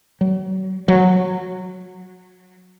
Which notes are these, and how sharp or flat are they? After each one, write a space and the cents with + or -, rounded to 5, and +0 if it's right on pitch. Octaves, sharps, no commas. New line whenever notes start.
F#3 +30
F#3 -20